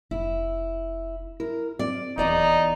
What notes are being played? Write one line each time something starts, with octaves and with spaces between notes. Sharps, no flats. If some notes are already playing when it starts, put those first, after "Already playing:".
F1 E4
E4 A#4
C4 D5
D#1 E2 D#4 D5 A#5